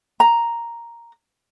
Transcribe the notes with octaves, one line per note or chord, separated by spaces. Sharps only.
A#5